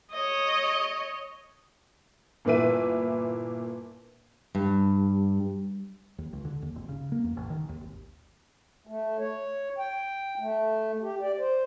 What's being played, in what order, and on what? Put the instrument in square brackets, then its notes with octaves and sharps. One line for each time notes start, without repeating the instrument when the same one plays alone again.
[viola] C#5 D#5
[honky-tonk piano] G1 A#2 E3 B4 E5 D#7
[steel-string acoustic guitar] G2
[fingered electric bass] D#2
C#2
D3
D#2
G#1
C#3
A#3
E2
A1
D#3
D#2
G#1
[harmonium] A3
C#5
G5
A3
G4
D5
C5